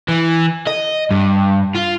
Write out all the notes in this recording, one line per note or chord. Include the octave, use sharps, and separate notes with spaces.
E3
D#5
G2
F4